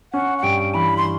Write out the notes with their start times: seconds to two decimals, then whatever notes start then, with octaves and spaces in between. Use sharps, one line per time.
0.13 C#4 F#5
0.38 F#5
0.43 G2 G5
0.74 E3 B5
0.97 C6